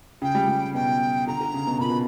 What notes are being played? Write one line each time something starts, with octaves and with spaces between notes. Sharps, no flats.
C#3 G5
G3
G3
B2 G5
D3 A#5
D3
C#3
B2
A#2 B5
B2